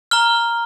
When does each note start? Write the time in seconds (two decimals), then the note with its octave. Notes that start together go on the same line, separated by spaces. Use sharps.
0.11 A#5 F6 G7